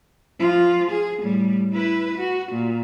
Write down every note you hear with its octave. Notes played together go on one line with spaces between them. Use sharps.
F3 F4
G#4
A2 G3
E4 B4
F#4
A#2